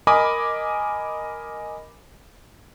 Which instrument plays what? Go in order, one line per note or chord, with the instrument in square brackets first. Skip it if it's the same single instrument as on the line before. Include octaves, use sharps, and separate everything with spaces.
[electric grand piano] A#4 D#5 G#5 B5 D6 D#6